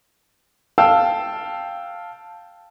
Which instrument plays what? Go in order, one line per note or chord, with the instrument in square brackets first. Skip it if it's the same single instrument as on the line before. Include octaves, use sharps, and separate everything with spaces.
[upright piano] F5 G5 A5 E6